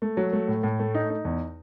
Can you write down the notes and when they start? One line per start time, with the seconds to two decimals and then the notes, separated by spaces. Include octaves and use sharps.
0.02 A3
0.17 F#3
0.33 A3
0.48 A2
0.63 A2
0.79 A3
0.95 D#4
1.10 D#4
1.25 E2